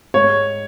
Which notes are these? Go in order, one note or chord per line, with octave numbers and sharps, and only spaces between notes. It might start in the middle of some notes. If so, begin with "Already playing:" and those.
G#2 C#5